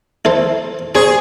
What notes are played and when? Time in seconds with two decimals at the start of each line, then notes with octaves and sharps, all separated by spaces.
0.25 E4 A4 C5
0.95 G#4 C5 C#5